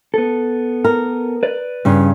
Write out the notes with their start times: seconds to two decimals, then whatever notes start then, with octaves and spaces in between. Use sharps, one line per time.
0.14 B3 A4
0.84 A#4
1.43 B4 D5
1.85 G2 C#3